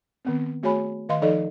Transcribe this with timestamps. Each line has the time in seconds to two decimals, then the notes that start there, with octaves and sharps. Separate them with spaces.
0.25 D#3 B3 C4
0.63 A3 F#4 G#4 C#5 G#5 B5
1.09 D#3 D#5 F5 C6
1.22 F3 D#4 A4 D5 D#5